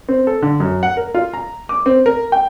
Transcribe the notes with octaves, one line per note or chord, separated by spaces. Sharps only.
C4
A4
D3
F#2
F#5
A#4
F4
A#5
D6
C4
A#4
G5